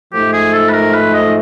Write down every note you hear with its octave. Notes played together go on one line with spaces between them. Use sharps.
G#2 F3 A3 G4
G#4
A4
B4
A#4
B4
D#5